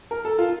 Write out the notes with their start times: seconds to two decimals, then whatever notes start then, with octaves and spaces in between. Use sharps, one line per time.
0.11 A#4
0.25 A4
0.38 F4